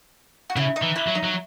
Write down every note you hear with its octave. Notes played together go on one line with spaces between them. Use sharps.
F#4
C#3 E4
D#4
E3
E4
F#3
D#4
F#3